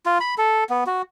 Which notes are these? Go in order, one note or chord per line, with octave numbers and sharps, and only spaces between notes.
F4
B5
A4
B3
F#4